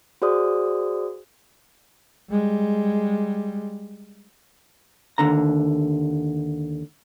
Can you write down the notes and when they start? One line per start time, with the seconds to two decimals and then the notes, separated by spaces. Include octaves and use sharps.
0.22 F#4 G#4 C5 D5 D#6
2.30 G3 G#3
5.18 D#2 D3 A#5